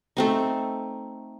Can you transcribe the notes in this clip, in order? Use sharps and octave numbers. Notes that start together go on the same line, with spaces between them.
A3 C4 D#4